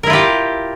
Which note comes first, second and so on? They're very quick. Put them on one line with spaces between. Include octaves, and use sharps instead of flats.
A#4 E4 F4 G4